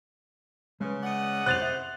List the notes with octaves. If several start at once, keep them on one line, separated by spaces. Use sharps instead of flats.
C#3 G#3 B4
D5 D#5 F#5
C3 C5 F#6 A6 F7
E5